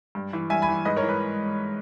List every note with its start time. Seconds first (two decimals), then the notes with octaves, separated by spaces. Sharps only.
0.15 G2
0.33 E3
0.50 G2 E5 G#5
0.62 G#5 B5
0.69 E3
0.85 G#2 B4 D#5
0.96 A#4 C#5
1.02 E3
1.09 B4